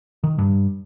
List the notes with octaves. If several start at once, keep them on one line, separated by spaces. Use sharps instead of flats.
D#3
G2